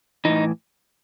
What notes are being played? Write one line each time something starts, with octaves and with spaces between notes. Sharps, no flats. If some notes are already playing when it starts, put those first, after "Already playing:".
A2 E3 D#4